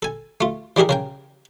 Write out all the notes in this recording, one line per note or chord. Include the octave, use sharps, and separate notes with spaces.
A4 G#5
A3 F4
E3 G3 G4 G#4 A#4
C#3 A#4 G5